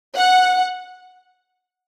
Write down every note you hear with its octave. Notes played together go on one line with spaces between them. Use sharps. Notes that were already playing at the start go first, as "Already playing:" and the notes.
F#5